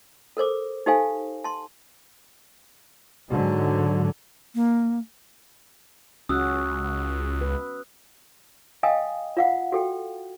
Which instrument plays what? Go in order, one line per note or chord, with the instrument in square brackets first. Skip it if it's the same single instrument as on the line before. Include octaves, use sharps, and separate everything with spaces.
[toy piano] A4 A#4 C5 D6
D#4 G4 A4 C5 F5 G#5
A5 C6
[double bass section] G#2 D3 F#3
[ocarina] A#3
[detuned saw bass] C#2 [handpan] C#4 F#4 [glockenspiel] D#6 E6 F#6
[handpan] B4
[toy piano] D#5 F5 G5 G#5 D#6
F4 F5 F#5
F#4 A4 G5